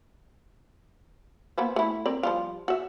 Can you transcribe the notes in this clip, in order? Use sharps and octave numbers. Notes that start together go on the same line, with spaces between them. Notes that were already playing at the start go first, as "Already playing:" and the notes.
A#3 B3 C5
A3 E4
C4 A#4 D5
F3 G3 F4
F#4 E5